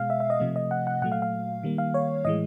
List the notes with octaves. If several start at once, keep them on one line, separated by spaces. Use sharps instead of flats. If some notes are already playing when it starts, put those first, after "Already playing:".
Already playing: B2 G#3 F5
E5
E5
D#5
C3 F3 A3
D#5
F#5
F#5
A#2 F#3 A3 F#5
F5
F5
D#3 G3 A#3
F5
C#5
A2 E3 G#3 D#5